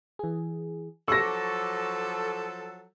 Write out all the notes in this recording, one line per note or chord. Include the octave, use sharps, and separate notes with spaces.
E3 G#4
F3 F#3 A4 C#6 D6 E6 A#6